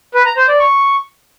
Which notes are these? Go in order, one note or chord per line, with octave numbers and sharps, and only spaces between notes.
B4
A#5
C5
D5
C#6